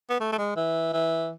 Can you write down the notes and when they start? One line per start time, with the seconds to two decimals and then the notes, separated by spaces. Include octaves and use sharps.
0.10 B3
0.20 A3
0.33 A3
0.38 G#3
0.56 E3
0.93 E3